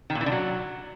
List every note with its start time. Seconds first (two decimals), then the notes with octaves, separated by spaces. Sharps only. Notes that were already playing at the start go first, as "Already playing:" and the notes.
0.10 D#3
0.15 A#2
0.21 E3
0.26 D3
0.32 F#3